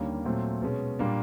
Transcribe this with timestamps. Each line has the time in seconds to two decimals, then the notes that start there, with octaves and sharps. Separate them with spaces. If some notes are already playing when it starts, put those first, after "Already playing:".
Already playing: D#2 D3 G3 A#3 C#4
0.25 A#2 F#3 A3 C4
0.62 B2 G#3 C#4
0.99 A#2 G3 A#3 D4